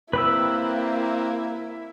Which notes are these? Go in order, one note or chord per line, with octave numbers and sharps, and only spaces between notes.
C3 G3 A#3 C4 E4 B4 B5 E6